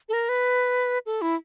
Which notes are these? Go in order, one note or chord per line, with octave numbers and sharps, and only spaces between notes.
A4
A#4
B4
A4
E4